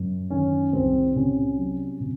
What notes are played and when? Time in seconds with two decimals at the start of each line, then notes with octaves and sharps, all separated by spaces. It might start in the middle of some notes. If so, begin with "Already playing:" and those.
Already playing: F#2
0.30 D#3 C#4
0.73 C2 C4
1.15 C3 C#4
1.58 F#3
2.01 C3